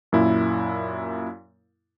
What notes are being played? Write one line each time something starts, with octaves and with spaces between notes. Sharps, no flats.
F#2 A#2 E4